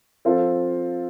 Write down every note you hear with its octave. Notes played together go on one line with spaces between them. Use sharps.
F3 C4 F4 A4